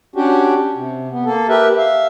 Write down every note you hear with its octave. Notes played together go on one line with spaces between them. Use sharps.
C#4 D4 F#4 G4
C3
B3
A#3 A4
G4 A#4 B4 E5
E5 F5